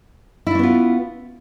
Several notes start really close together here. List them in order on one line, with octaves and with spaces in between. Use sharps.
E4 D4 C#4 B3 F4